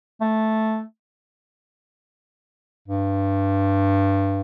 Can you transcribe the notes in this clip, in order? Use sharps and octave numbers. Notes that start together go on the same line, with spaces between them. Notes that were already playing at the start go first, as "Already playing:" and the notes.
A3
G2